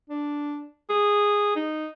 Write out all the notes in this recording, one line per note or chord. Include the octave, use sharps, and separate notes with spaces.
D4
G#4
D#4